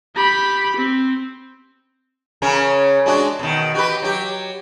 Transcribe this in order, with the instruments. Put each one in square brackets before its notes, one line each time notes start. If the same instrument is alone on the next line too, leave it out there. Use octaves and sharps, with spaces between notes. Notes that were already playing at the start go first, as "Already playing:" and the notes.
[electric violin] G4 B5
C4
[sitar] C#3 C#4 A#4
G#3 D4 F#4
B2 D#3
F#4 G4 B4
F#3 G4